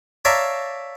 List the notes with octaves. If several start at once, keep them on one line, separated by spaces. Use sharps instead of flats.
C#5 D5 E5 F5 A5 A#5